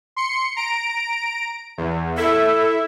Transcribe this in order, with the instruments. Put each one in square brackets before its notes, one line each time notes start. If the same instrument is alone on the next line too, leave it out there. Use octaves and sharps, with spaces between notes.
[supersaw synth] C6 C#7
A#5 D7
E2
[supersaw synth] E4 E5 [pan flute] A4